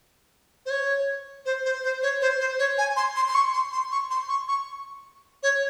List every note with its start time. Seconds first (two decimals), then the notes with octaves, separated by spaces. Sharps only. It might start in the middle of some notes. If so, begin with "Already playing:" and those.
0.66 C5
0.70 C#5
1.46 C5
1.65 C5
1.84 C5
2.03 C#5
2.21 C5
2.40 C5
2.59 C#5
2.78 G#5
2.96 C6
3.16 C6
3.28 C6
3.35 C#6
3.53 C6
3.72 C6
3.92 C#6
4.11 C6
4.29 C#6
4.48 C#6
5.43 C#5